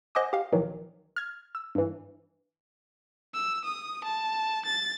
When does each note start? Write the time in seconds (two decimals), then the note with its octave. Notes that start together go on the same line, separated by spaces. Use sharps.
0.15 C5 D#5 F#5 G#5 D6 D#6
0.33 G4 F5
0.52 A#1 D#3 E3 F#3
1.16 F6 G#6
1.55 E6
1.75 G2 E3
3.34 E6
3.65 D#6
4.05 A5
4.66 A6